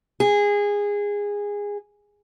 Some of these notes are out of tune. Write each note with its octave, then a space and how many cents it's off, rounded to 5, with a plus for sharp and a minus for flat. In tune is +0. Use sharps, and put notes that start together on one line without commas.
G#4 -20